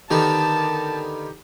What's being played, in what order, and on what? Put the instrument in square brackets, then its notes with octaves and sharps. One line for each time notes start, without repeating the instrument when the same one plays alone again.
[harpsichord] D3 D#3 B3 [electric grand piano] D#4 G4 [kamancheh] A5